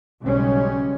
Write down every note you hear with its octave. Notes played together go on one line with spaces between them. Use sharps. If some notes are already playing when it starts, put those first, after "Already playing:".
B1 C#3 G3 G#3 C#4